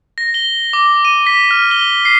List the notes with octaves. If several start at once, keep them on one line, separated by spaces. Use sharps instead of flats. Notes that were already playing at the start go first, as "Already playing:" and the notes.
A#6
G7
D6
D#7
B6
F6
G7
C7